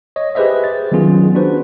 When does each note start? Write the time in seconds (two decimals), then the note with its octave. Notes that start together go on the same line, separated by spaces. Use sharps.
0.16 C#5 D#5
0.35 G4 G#4 B4 C5 D#5 E5
0.64 A6
0.92 D#3 F#3 B3 C#4 F4 G#4
1.35 D4 F#4 B4 C5